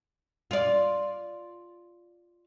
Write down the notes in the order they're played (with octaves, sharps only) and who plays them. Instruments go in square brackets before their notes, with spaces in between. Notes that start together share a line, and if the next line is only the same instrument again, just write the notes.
[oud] F4 D5